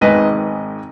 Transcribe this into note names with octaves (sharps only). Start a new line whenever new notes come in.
G#1 G#2 D#3 G#3 B4 D#5